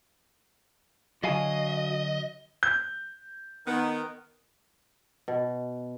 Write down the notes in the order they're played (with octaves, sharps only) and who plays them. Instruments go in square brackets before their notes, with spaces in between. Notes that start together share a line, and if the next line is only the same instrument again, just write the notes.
[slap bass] D3 F#3 [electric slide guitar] F#4 F5 G#5 [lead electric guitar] D#5
[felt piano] G6
[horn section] D#3 B3
[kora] B2